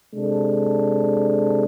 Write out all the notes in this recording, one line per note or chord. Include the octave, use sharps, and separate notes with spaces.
C3 G#3 D4 A4